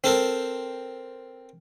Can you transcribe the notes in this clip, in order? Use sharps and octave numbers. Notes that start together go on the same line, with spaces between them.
C4 A4 A#4